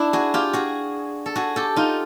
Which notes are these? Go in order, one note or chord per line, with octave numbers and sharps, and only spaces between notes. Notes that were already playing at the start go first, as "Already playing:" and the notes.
Already playing: D4 E4
F#4 G#4
F4 G4
F#4 G#4
A4
F#4 G#4
G4 A4
D#4 F4